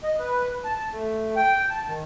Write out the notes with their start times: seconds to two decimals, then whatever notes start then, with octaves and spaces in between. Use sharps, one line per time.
0.03 D#5
0.19 B4
0.64 A5
0.93 A3
1.36 G5
1.70 A5
1.88 D#3